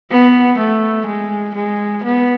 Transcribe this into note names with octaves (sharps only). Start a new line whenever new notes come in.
B3
A3
G#3
G#3
B3